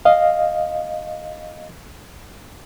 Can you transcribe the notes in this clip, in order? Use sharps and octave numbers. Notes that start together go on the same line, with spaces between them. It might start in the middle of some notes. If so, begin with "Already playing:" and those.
D#5 F5